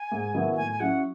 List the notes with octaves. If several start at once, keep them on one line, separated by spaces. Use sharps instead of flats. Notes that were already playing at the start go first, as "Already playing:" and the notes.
Already playing: G#5
G#2
D#3 F#3 B3 E4
A2 G#5
G#5
F#3 C#4 E4 F#5